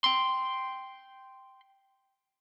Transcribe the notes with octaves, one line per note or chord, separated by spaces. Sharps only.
G5 C6